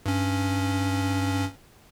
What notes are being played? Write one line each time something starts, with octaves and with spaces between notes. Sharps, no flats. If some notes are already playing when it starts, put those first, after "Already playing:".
G2 C#4